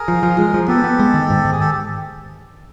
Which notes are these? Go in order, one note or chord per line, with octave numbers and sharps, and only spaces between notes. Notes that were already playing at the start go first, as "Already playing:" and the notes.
Already playing: G#4 A#4
F3
F3
G#3
F3
B3 G4 A4
B3
G#3
D#3
G#2
D#3
G#4
G4 A4